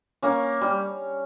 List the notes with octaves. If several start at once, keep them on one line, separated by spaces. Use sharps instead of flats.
A#3 C#4
G3